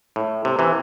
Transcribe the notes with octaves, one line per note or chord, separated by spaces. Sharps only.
A2
C3
C3 E3